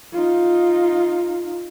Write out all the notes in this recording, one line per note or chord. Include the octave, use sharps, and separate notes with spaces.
D#4 F4